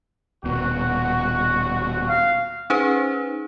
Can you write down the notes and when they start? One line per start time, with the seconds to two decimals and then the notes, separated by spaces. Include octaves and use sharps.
0.44 D#1 B2 F#4
2.09 F5
2.70 C#4 D#4 G#4 B4 C5